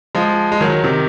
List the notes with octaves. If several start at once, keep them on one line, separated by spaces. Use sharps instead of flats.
F3 G#3
G#3
D#3 F#3
C3 D#3